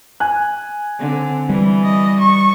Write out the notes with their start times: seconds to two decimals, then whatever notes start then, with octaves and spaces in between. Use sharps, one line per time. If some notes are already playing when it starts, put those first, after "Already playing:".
0.20 G#5 F#6
1.00 D3 C4
1.50 E3 G3
1.84 D#5
2.20 C#6